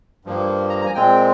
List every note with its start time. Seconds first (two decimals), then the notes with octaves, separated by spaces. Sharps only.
0.25 G2 F3 A#3
0.70 A#5
0.81 A#5
0.86 G#5
0.95 A#2 G#3 C4 G5